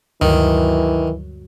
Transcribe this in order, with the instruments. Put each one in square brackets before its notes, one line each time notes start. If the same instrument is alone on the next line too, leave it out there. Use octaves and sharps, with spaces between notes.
[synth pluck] D2 G2 F#3 [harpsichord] D#3 [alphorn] E3